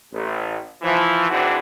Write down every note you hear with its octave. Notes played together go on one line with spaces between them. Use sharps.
A1
E3 F3
G#1 G#2 E3 C4 D4 F#4